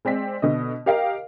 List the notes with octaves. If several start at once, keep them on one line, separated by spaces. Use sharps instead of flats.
G#3 C4 D5 B6
B2 D3 D#5
G4 A#4 D#5 F5 G5